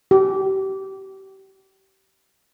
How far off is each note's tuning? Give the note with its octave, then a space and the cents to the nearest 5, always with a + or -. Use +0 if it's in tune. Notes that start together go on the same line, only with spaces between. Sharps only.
G4 -30